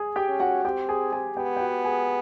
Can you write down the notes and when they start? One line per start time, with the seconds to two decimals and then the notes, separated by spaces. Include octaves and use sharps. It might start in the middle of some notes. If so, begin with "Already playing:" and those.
Already playing: G#4 G#5
0.16 G4 G5
0.28 C#4
0.40 F#4 F#5
0.64 C4 G4 G5
0.89 G#4 G#5
1.12 G#4 G#5
1.36 B3 G4 G5
1.57 G5
1.60 F#4 F#5
1.84 G#4 G#5